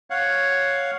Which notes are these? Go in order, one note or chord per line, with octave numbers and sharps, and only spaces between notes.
C#5 F5 F#5